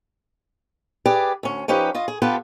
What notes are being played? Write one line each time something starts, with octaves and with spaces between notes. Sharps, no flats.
G4 G#4 B4 D5
D2 C#4
F3 C#4 D#4 G4 B4
F4 D#5
G#4
B3 F4 G4 A4 B4